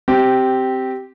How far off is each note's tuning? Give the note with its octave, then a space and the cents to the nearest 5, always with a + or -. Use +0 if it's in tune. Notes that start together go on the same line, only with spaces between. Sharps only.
C4 +0 G4 -10